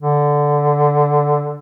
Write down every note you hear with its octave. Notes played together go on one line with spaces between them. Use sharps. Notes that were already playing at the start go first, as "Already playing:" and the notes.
D3